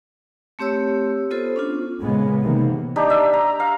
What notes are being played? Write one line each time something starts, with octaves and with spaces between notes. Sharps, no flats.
A3 C4 G4 C#5 E6
B3 F4 A4 C5
C#4 D4 F4
A#2 C#3 G#3 B3
C3 D#3 E3 A#3 B3
D4 D#4 G4
E5
A#5
F5